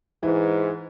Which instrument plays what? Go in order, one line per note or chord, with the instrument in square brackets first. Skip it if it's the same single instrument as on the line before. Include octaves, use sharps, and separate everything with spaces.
[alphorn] G#2 [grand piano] E3